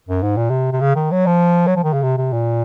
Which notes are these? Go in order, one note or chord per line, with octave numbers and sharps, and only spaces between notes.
F#2
G#2
A#2
C3
C3
C#3
D#3
F#3
F3
F#3
F3
D#3
C#3
C3
C3
A#2